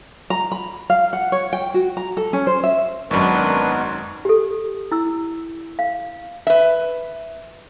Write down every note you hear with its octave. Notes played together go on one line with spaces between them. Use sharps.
A#5
B5
F5
F#5
C#5
G5
F#4
A#5
A4
C#4
C5
E5
G#1 F#2 B3 D4 D#4 A#4 B4 C#6
G4 A4
E4 E6
F5
B4 E5